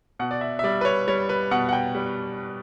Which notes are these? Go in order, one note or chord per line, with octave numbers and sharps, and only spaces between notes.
B2 F#5
D5
E5
E5
G3 D5
B4
C#5
G3 C#5
B4
B2 F#5
F#5
G5
G3